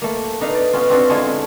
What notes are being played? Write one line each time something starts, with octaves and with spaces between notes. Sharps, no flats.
A3 A#3
D4 D#4 B4 F5
D5
B3 C#4 F4
C4 D4 F4 F#4
D3 G#3 A3 E4 F4 G#4